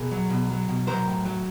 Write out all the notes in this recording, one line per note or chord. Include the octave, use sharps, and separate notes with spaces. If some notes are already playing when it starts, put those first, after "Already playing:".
Already playing: B2 G#4 A#4
F#3
B2
F#3
B2
F#3 A#4 C5
A2
F#3